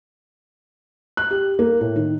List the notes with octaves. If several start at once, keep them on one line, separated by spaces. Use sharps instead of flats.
F#6
G4
A#3
A2
D#3